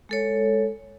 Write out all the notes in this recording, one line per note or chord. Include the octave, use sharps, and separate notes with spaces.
G#3 A4 C#5